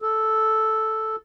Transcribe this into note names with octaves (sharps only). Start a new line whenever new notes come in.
A4